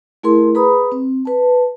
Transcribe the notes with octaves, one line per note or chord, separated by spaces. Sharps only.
A3 E4 G#4 A#4 C6
G#4 B4 A#5 B5 D#6
C4
B4 A5